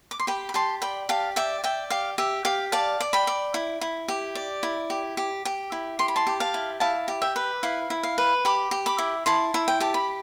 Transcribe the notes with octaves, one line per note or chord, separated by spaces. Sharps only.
D6
C6
G4 G5 B5
B5
G4 A5 C6
D5 G5 B5
G4 F5 A5
D5 E5 G5
D5 E5 G5
G4 F5
G4 E5
G4 F5
D5 F5 A5
D5
G5 B5
D5
E4
E4
G4
D5
E4
G4
G4
G4
E4
G4 C6
B5
A5 C6
G4
F5 A5
E4
E4 F5 A5
G4
E5 G5
B4
E4 F5
E4
F5
B4
G4 B5 D6
G4
B5 D6
E4
E4 A5 C6
E4
G5
G4 A5
B5